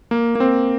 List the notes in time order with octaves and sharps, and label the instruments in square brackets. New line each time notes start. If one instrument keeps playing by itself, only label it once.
[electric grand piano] A#3
A#3
C4